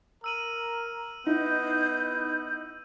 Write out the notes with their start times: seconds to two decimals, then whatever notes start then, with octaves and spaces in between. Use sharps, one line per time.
0.24 A#4 E6 D#7 F#7
1.27 B3 D#4 E4 G6